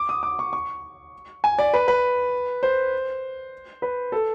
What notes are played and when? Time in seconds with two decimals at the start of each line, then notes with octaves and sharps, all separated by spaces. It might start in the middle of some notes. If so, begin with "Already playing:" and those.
Already playing: D6
0.09 D#6
0.23 D6
0.39 C#6
0.53 C#6
1.44 G#5
1.59 D5
1.74 B4
1.88 B4
2.63 C5
3.82 B4
4.12 A4